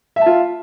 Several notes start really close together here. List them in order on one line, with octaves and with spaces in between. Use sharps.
E5 A5 F4